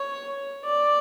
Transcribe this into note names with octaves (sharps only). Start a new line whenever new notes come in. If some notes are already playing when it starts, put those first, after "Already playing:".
Already playing: C#5
D5